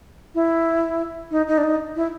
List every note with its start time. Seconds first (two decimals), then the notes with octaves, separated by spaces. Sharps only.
0.35 E4
1.31 D#4
1.48 D#4
1.58 D4
1.64 D#4
1.96 E4